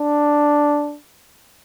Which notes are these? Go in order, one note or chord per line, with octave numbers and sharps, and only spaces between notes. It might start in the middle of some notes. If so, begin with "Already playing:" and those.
Already playing: D4